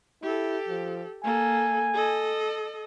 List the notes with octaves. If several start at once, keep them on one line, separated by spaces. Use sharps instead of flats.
E4 G4 A4
F3
A#3 A4 G#5
A4 D#5